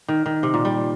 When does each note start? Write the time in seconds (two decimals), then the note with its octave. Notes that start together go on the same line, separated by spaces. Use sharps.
0.08 D#3
0.26 D#3
0.43 C3
0.54 A#2
0.65 G3